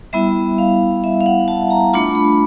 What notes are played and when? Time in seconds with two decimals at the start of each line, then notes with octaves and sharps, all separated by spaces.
0.13 G3 B3 E4 E5
0.58 F5
1.04 E5
1.21 F5
1.26 F#5
1.48 A5
1.71 A#5
1.94 A3 D4 F4 B5
2.15 B5